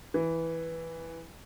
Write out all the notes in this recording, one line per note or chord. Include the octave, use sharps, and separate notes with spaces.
E3